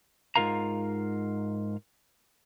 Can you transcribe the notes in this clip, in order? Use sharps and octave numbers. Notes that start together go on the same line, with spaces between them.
G#2 G#3 F4 A#4 F5 A#5